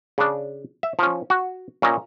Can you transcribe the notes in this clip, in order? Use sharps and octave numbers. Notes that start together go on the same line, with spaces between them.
C#3 D4
E5
F3 C#4
F#4
A#2 C#4 D#5 A#5